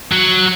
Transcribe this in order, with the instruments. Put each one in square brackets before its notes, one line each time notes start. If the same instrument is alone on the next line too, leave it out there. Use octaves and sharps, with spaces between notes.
[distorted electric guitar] F#3